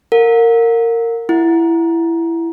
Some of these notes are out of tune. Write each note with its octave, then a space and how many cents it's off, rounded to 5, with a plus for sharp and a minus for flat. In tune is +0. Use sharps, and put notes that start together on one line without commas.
A#4 -20 F#5 -45
E4 +15 F#5 -15